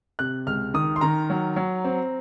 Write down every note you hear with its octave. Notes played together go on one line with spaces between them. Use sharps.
C3 F#6
C#2 F6
D#3 D#6
C6
D#3 A#5
F#3
F#3
C4